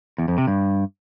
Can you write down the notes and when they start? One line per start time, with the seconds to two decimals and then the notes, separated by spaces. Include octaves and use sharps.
0.18 E2
0.28 F2
0.38 C3
0.48 G2